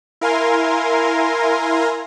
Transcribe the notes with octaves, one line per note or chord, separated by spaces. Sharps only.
E4 A#4 F5 G#5 A#5 C6